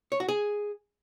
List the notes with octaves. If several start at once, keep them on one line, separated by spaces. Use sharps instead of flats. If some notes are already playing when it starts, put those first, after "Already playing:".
C#5
F#4
G#4